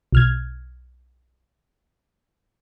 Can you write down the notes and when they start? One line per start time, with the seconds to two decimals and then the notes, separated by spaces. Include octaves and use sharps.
0.13 B1 F6 G#6